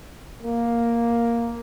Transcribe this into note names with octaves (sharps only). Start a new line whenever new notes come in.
A#3